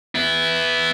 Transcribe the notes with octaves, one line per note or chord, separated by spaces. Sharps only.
B3 E4